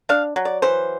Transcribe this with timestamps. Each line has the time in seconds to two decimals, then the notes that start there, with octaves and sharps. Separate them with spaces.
0.09 D4 F5
0.36 F#3
0.45 D5
0.62 E3 C5